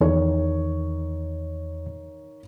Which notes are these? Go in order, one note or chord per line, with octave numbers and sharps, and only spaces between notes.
E2 D#3 C#5